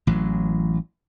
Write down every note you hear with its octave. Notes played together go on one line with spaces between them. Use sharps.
A1 E3 F#3